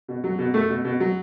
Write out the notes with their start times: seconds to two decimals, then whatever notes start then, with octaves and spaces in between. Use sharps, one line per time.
0.08 B2
0.24 F#3
0.38 B2
0.54 A3
0.70 B2
0.85 B2
1.00 F#3